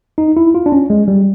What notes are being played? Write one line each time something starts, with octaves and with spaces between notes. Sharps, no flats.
D#4
E4
F4
D4
C#4
G#3
G3